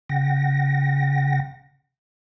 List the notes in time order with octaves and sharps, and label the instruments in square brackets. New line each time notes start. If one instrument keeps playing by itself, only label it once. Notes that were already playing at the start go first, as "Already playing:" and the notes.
[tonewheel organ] C#3 F#5 G5 A#6